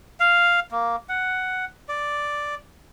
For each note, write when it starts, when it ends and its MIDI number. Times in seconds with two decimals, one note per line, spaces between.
0.20 0.60 77
0.71 0.96 58
1.09 1.65 78
1.89 2.55 74